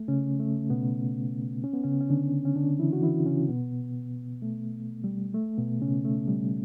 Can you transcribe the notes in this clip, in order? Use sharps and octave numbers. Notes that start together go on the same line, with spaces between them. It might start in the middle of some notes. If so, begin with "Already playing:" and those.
Already playing: A3
C#3 C#4
A3
B2 B3
C#4
B3
C#3 C#4
C#4
D3 D4
C#4
D3 D4
E3 E4
F#4
E3 E4
C#3 C#4
B2 B3
A3
G3
A3
B2 B3
C#3 C#4
A3
G3